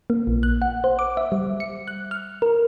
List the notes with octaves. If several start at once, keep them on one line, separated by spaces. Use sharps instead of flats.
A#3
A#1
F#6
F#5
C5
D6
E5
G3
C#7
F#6
F6
A#4